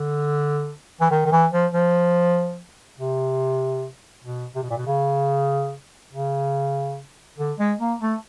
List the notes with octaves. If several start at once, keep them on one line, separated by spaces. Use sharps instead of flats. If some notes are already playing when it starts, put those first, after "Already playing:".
Already playing: D3
E3
D#3
D#3
E3
F3
F3
C3
B2
C3
B2
A#2
B2
C#3
C#3
D3
G#3
A#3
A3